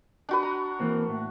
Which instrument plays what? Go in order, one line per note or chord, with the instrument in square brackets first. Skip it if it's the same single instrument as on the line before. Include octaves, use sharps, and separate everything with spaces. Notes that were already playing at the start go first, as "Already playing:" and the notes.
[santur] D4 F#4 B4
A#5
[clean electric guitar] E3 A#3 C4
A2